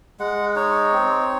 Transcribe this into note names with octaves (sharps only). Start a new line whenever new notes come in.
G#3 F#5
D#4 C#5
C4